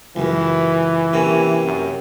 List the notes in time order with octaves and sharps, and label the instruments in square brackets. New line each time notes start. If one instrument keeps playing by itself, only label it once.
[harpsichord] C#2 F#2 [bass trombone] E3
[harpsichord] C3 A#3 C#4
[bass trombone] F#2